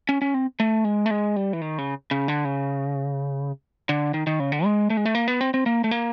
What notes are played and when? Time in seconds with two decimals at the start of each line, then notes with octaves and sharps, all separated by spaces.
0.09 C#4
0.22 C#4
0.34 C4
0.60 A3
0.84 G#3
1.06 A3
1.11 G#3
1.36 G3
1.53 E3
1.61 D#3
1.78 C#3
2.11 C#3
2.28 D3
2.45 C#3
3.89 D3
4.14 D#3
4.27 D#3
4.40 C#3
4.52 D3
4.64 G#3
4.90 A3
4.97 G#3
5.05 A3
5.15 A#3
5.28 B3
5.41 C4
5.54 C4
5.66 A#3
5.84 A3
5.91 A#3